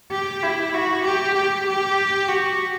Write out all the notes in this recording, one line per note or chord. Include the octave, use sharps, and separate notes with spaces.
G4
E4
F#4
G4
G4
G4
F#4